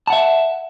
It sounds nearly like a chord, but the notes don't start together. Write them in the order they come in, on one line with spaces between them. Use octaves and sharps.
A5 F#5 E5